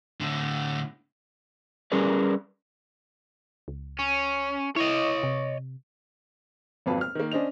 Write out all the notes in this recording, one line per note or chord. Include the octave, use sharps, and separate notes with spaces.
A2 D3
G3 C#4 G#4 A#4 B4 D5
C#2
C#4
E4 C#5 D#5
C3
G#1 F2 F#3 B4 F5 A5
F6
D#3 A#3
C#4 D4 C5 D#5 F7